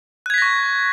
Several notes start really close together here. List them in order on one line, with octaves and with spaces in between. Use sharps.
F#6 G#6 B6 A#6 C#6